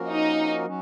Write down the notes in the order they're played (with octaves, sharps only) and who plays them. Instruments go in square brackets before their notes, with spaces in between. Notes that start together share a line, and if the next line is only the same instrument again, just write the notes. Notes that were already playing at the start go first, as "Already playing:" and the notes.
Already playing: [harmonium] F3 A#3 C#4 F#4 A#4
[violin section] D#4
[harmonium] F#3 C#4